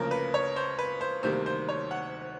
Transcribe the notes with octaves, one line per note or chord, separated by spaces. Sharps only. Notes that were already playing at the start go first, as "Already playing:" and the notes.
Already playing: D2 C#3 F3 A#3 A#4
B4
C#5
C5
B4
C5
D2 C3 D#3 G3 A#3 C5
C5
C#5
F#5